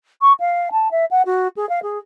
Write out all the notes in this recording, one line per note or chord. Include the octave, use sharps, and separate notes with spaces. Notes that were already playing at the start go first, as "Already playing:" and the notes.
C#6
F5
A5
E5
F#5
F#4
G#4
F5
G#4